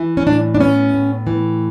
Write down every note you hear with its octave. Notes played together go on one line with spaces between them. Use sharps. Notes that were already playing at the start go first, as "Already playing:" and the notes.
Already playing: E3
C#4
A2 D4
D4
B3 C#4
A2
E3